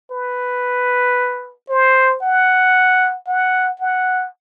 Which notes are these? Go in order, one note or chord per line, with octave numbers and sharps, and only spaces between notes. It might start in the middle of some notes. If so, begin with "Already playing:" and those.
B4
C5
F#5
F#5
F#5